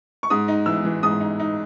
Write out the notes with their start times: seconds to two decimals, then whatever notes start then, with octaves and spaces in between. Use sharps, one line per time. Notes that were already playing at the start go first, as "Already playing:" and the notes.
0.23 C#6
0.30 G#2 D#6
0.48 D#4
0.66 E3 E6
0.85 E3
1.03 G#2 D#6
1.20 D#4
1.40 D#4